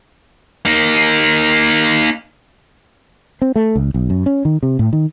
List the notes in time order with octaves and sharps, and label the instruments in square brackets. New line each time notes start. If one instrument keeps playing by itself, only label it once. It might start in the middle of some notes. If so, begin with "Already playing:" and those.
[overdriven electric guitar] A#3 D#4
[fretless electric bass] C4
A3
C#2
B1
F#2
C#4
D#3
C3
A2
D#3